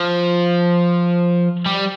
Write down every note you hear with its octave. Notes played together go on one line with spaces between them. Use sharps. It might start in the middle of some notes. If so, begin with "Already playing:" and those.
Already playing: F3
G3